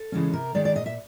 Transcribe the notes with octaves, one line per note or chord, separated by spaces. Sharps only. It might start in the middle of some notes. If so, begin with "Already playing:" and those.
Already playing: A4
C#3 E3 G#3 C#4
C3 A#4
D#3 G#3 D5
D5
A#2 D#5
E5